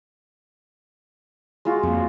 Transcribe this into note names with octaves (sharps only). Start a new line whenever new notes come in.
G#3 F4 F#4
F2 A#3